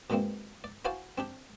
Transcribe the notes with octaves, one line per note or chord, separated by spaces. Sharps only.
B2 E3 G#3 A#3 C4
D5
E4 F#4 C5 D5 F5 G#5
C4 D4 G4